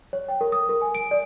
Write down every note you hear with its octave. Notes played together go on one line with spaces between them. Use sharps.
C#5
G5
A#4
D#6
A#4
G#5
D7
D5